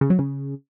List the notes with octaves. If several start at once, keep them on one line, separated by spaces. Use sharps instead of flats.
C#3
F#3
C#3